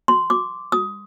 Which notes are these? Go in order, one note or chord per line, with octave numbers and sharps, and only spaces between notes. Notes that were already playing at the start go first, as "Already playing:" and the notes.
C6
D6
D#6